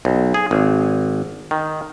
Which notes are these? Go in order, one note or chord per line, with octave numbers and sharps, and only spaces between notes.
B1
G#4
G#1
D#3